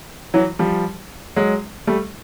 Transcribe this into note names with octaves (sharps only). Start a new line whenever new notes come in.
E3 F#3
F3 G3
F#3 G#3
G3 A3